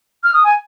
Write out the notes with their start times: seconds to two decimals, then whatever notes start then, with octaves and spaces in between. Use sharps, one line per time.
0.24 F6
0.34 D#6
0.44 G#5